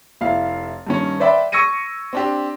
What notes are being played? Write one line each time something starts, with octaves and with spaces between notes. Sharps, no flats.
F1 E4 F5
G2 D#3 C#4
B4 C5 D5 E5 G5 B5
C#6 E6 G#6 A#6 C#7 D#7
C4 D4 G4